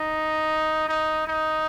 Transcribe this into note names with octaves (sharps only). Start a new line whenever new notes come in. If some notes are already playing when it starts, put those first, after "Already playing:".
Already playing: D#4
D#4
D#4